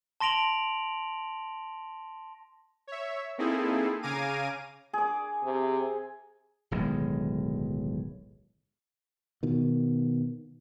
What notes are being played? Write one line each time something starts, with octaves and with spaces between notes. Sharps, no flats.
A5 C6 A#6 D7 F7 F#7
C#5 E5
A#3 C4 D#4 E4 G#4 A4
C#3 F5 G#5 A#5 D6 D#7
G#4 D6
C3
D1 B1 D#3 G#3
B2 D#3